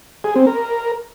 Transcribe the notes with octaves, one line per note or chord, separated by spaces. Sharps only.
G#4
C4
A#4